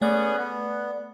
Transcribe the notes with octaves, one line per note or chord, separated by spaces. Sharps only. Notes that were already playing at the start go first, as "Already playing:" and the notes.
A3 B3 C#4 G#4 D5 F#6
B3